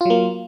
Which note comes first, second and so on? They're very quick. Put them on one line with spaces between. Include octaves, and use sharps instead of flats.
F4 F#3 A#3